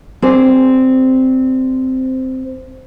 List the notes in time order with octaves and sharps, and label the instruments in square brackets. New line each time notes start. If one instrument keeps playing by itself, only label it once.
[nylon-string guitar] C4 G#4 D5